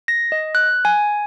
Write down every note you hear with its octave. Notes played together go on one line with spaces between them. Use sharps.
A#6
D#5
F#6
G#5